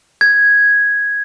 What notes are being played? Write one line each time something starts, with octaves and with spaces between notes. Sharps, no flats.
G#6